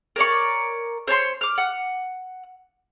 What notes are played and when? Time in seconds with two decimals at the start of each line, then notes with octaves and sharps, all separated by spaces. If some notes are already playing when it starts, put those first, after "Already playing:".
0.16 A#4 C#5 D5 C#6
1.08 C5 C#5 A5 C6
1.41 D6 F6
1.58 F#5